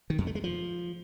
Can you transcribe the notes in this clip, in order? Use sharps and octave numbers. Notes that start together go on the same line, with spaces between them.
D#3
F2
A3
G#3
F3